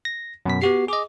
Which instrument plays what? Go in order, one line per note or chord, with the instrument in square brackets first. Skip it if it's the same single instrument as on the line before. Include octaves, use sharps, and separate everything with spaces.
[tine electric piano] A#6
F#2 B2 B6
[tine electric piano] B3 F#4 C7 [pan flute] G4
[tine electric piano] G#4 D#5 [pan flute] D6